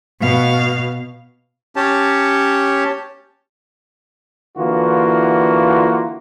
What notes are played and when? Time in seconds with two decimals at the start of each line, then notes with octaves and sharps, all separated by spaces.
0.20 B2 F5
1.76 C#4 G4 C#5 A5
4.57 D3 E3 A#3 F4 F#4